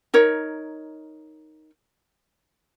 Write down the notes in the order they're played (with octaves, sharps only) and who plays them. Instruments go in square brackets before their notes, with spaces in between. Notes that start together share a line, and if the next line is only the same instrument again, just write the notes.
[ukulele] D#4 A#4 C#5